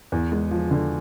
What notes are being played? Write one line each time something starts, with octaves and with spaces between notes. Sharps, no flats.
E2
G#3
F3
D3